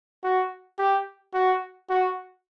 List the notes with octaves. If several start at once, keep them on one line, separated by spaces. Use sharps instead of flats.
F#4
G4
F#4
F#4